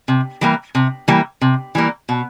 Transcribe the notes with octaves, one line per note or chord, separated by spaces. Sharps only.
C3
E3 G3 A#3
C3
E3 G3 A#3
C3
E3 G3 A#3
B2